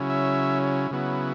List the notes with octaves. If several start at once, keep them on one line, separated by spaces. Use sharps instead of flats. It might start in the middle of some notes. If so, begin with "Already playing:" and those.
Already playing: C#3 F#3 C#4 E4
E5
C#3 F#3 B3 E4